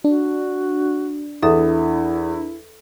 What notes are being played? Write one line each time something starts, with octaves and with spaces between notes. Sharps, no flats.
D4 F#4
E2 E4 A4 E5 D#6